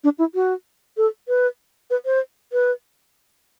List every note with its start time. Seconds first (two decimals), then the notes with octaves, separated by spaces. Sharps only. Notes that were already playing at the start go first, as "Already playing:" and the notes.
0.04 D4
0.19 E4
0.35 F#4
0.97 A4
1.28 B4
1.90 B4
2.06 C5
2.53 B4